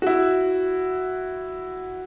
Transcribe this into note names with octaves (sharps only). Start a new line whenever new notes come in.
E4 F#4